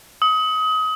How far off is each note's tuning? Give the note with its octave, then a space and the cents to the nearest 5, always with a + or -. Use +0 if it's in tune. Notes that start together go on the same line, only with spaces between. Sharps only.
D#6 +30